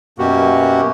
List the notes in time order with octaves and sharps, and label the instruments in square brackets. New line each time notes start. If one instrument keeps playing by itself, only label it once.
[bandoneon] F#2 B2 A#3 F#4 G4